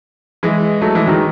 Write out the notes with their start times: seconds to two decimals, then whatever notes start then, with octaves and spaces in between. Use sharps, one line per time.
0.43 E3 G#3
0.81 F#3 A3
0.95 E3 G#3
1.07 D#3 F#3